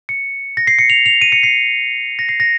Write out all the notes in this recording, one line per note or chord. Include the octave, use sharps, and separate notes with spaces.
C#7
A#6
C7
C#7
F7
F7
D#7
C#7
C7
A#6
C7
A#6